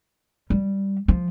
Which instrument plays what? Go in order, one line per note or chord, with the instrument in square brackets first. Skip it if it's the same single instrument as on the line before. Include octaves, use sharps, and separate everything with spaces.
[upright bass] G3
F3